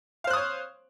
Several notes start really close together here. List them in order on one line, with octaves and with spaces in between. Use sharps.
F5 C5 F#6 D#6 C#5